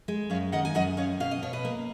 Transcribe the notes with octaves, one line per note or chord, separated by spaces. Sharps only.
G#3
F#2 C#5 F5
D#3 D#5 F#5
G#5
F#2 D#5 F#5
F#2 C#5 F5
B2 F5
D#5
B2 C#5
B4 D#5
A#3